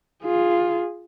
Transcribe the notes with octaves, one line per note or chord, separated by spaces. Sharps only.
F4 G#4